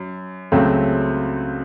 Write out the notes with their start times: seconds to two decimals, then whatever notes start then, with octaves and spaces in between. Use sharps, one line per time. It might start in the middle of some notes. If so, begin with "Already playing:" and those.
Already playing: F#2
0.52 C#2 C#3 F#3 A3 C4